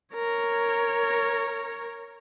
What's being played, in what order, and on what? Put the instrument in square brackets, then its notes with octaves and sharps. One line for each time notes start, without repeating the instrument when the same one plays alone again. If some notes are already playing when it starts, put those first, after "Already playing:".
[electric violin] A#4 C#5